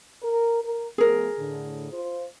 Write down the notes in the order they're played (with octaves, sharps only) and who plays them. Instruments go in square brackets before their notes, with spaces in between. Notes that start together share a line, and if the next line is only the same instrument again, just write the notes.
[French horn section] A#4
A#4
[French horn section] F3 A3 B3 [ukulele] G#4 A#4
[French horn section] A2 D3
F4 C5